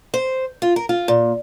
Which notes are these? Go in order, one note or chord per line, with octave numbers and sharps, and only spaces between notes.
C5
F4
A#4
F4
A#2